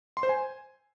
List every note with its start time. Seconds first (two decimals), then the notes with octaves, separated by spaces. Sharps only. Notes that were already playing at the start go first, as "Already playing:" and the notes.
0.17 C6
0.23 C5
0.29 G#5